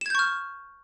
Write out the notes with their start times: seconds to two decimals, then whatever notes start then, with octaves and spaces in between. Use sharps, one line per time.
0.01 E7
0.06 G#6
0.10 G6
0.15 C#6
0.19 F6